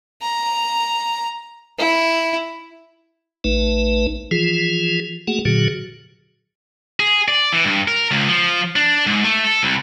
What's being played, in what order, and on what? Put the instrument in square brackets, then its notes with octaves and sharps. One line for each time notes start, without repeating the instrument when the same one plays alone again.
[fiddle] A#5
E4
[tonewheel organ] A1 A3 D#4 B4
E3 F3 F4 G#4
A3 A#3 F#4 G#4 F#5
A#2 D3 F#3 F#4 G#4
[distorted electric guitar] G#4
D5
E3
G2
A#4
C#2
F3
D4
G#2
A3
A4
C2